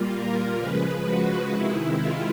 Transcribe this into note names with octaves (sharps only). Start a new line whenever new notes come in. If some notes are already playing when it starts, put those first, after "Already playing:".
Already playing: A#2 G3 A#3 F4
A#4
C#3 F3 G#3 B4
F#4
C3 D#3 G#3 E4
F4